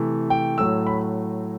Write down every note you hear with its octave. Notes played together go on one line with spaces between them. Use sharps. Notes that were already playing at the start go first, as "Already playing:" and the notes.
Already playing: C3 E3 A3
G5
A2 F#3 A3 E6
B5